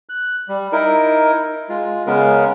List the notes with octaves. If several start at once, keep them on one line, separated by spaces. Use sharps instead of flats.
F#6
G3
D#4 E4 A#4
G#3 F4
C#3 G#3 B3 C#4 A#4